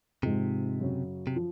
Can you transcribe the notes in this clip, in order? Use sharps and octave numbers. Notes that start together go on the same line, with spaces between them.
G#2 C3 F3 G#3
F#2 C#3 F#3 C#4
C3
F3